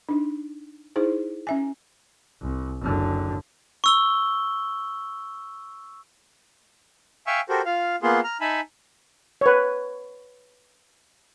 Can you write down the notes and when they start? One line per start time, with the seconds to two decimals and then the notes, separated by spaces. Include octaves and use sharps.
0.09 D4 D#4
0.96 D#4 E4 G#4 C5
1.47 C#4 E5 G#5
2.41 C2
2.81 F#1 D3
3.84 C#6 E6 G7
7.27 E5 F5 G5 G#5 C#6 E6
7.49 F#4 G4 A4 A#4 C5
7.66 F4 F5
8.02 A#3 B3 F4 G#4 C6
8.24 A#5 F6
8.41 D#4 E5 G#5 A5 B5
9.41 B4 C#5